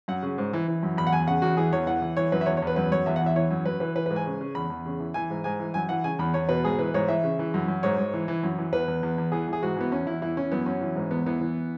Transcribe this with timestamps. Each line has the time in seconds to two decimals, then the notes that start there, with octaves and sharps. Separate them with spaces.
0.08 F#2 F#5
0.23 C#3
0.38 G#2
0.53 E3
0.68 E3
0.83 F#2
0.97 E2 B5
1.07 F#5
1.12 E2 G#5
1.27 C#3 F#5
1.42 E2 F#4
1.57 E3 G#4
1.72 E2 C#5
1.87 E3 F#5
2.02 E3
2.17 E3 C#5
2.32 F#2 B4
2.41 E5
2.46 E2 C#5
2.57 C#5
2.62 E2 B4
2.76 F#2 B4
2.91 F#2 C#5
3.06 E2 E5
3.16 F#5
3.21 E3
3.26 E5
3.35 E3 C#5
3.51 F#2
3.65 F#2 B4
3.80 E3 B4
3.95 E3 B4
4.06 B4
4.10 G#2
4.16 G#5
4.26 C#3
4.41 C#3
4.55 E2 B5
4.70 E2
4.86 C#3
5.00 E3
5.14 E3 G#5
5.30 G#2
5.44 G#2 G#5
5.60 E3
5.74 F#2 G#5
5.89 E3 F#5
6.04 C#3 G#5
6.19 E2 B5
6.34 E2 C#5
6.49 B2 B4
6.64 G#2 G#4
6.79 E3 B4
6.94 G#2 C#5
7.08 E3 E5
7.24 C#3
7.39 E3
7.54 F#2
7.68 F#2
7.83 G#2 C#5
7.98 G#2
8.14 E3
8.28 E3
8.43 F#2
8.58 E3
8.72 E2 B4
8.88 E2
9.03 E2
9.18 E2
9.32 E3 G#4
9.48 E3 G#4
9.62 G#2 F#4
9.77 E3 B3
9.91 E2 C#4
10.06 E2 E4
10.22 E3 E4
10.37 E3 C#4
10.52 F#2 B3
10.66 F#2 C#4
10.81 E3
10.96 G#2
11.11 E2 B3
11.26 E3 B3
11.41 E3